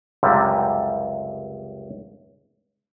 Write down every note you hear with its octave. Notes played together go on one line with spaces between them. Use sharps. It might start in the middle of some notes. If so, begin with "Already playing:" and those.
C#2 F#2 C3 G3